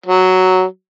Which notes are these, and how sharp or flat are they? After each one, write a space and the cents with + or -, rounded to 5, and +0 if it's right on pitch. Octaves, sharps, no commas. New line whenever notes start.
F#3 +5